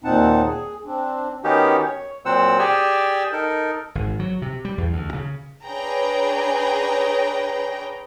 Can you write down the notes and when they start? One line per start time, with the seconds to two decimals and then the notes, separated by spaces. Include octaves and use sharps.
0.04 D#2 A#2 C4 D#4 F#5 A5
0.46 G#4
0.86 C4 D4
1.44 D#3 B3 C#4 D#4 F#4 G4
1.85 C#5
2.25 A#2 F#3 C4 C5 F#5 E6
2.59 G4 G#4 D5 G5 G#5 E6
3.32 D#4 A4 A#4
3.95 G#1
4.19 F#3
4.42 C3
4.65 G3
4.78 E2
4.93 D2
5.14 C#3
5.66 D4 G#4 B4 C#5 G5 A#5